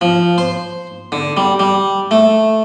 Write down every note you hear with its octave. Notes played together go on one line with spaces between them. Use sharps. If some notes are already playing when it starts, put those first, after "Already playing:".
F3
C5
D3
G3
G3
A3